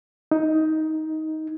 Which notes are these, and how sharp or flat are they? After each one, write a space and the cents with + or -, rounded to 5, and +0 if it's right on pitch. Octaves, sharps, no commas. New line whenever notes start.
D#4 +15